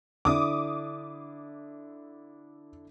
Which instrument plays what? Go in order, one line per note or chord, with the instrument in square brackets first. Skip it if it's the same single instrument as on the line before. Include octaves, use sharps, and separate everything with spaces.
[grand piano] D3 D4 E4 [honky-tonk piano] D6 D#6